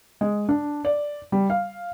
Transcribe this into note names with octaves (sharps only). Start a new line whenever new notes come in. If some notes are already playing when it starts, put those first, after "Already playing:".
G#3
D4
D5
G3
F5